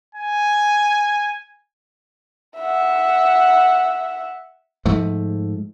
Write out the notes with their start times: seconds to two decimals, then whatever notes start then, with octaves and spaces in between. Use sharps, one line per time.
0.15 G#5
2.58 E5 F#5
4.86 G#2 F3 A3